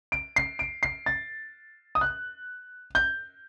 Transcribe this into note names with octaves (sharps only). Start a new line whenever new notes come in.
D7
C7
D7
C7
A6
D#6
F#6
G6